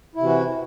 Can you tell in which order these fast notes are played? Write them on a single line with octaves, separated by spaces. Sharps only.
E4 C3 E3 F#4